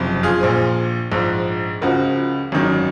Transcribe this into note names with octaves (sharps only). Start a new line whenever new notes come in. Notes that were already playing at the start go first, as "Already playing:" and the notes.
Already playing: F#1 F2 C3
F4 G#4
A#1 A#2 F3
A#1 G#2 F3
C#2 C#3 F3 F#4 A#4
G#1 F#2 D#3 F#3